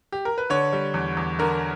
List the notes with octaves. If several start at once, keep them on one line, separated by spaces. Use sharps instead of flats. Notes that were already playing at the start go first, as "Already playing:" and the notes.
G4
A#4
B4
D3 C#5
G3
E2
E2
D3 A#4